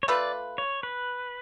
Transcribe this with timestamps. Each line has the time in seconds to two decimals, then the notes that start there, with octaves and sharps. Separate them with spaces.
0.03 C#5
0.08 A3 F4 B4 D5
0.58 C#5
0.83 B4